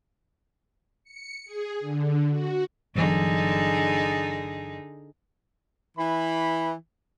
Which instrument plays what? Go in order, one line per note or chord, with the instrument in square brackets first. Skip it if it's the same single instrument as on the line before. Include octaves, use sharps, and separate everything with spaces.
[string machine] C#7
G#4
D3
F#4
[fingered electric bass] G1 E3 F#3 [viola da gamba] D3 D#4 G#4
[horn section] E3 B5